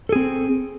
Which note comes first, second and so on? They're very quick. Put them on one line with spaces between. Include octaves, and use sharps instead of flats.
A4 G#4 C4